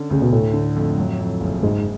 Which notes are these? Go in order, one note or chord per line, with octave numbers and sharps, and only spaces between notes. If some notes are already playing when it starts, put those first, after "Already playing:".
Already playing: D3 C#4
D2 C#3
B2
A2 A3
D3
F2
F#3
F2
F#1
G#2 G#3